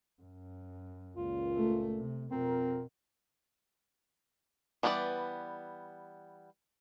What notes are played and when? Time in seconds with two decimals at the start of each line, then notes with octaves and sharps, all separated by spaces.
0.22 F#2
1.16 C#2 A#2 F4
1.55 A3
1.99 C3
2.31 F2 B2 C4 F4 A#4
4.83 E3 G3 B3 E4 D5